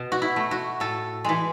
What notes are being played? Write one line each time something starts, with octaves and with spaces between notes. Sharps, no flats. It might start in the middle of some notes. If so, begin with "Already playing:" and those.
Already playing: B2
F#4
E4
A3
F#4
A2 A4
E3 G#3